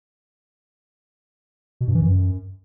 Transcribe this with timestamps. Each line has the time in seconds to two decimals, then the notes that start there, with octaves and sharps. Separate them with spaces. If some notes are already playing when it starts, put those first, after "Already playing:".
1.81 B2
1.88 G2
1.95 E3
2.02 F#2